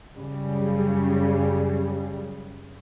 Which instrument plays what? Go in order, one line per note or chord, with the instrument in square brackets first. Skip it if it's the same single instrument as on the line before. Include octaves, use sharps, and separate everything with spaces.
[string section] F#2 C#3 G3